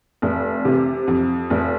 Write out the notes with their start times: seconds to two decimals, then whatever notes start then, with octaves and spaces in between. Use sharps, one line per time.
0.22 F1
0.65 C3
1.08 F2
1.50 F1